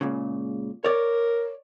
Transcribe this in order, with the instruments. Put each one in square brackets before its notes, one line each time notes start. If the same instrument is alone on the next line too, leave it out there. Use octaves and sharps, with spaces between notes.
[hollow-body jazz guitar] C#2 A#2 C#3
[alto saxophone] A#4 [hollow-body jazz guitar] C#5 D5